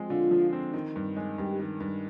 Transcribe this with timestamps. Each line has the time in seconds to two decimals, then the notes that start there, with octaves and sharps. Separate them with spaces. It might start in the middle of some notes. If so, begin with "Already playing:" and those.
Already playing: F3 G#3 C4
0.10 D3 F4
0.31 F3
0.53 C4
0.74 D#3
0.96 G2
1.16 G#3
1.38 G2 G4
1.59 D#3
1.80 G2